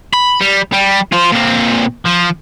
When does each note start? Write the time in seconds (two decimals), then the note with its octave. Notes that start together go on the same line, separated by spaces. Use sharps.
0.14 B5
0.41 G3
0.73 G3
1.13 F4 C5
1.32 A#2 C4
2.05 F3